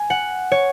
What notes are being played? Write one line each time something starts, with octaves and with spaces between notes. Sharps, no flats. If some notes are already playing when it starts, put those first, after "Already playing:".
Already playing: G#5
F#5
C#5